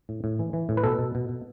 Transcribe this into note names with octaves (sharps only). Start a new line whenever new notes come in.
A2
A2
E3
E3
A2
B4
B2 A4
B2
B2
B2